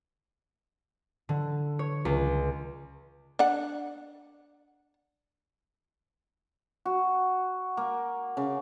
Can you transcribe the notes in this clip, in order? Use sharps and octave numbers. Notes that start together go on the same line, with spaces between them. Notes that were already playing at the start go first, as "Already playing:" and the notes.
D3
C#5
C#2
D4 F#5
F#4
A#3
C#3